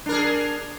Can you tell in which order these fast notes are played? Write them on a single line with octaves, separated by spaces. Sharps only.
D4 A#4 G#4